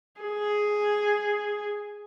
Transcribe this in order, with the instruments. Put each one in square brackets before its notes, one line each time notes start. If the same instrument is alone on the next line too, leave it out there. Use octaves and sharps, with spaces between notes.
[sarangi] G#4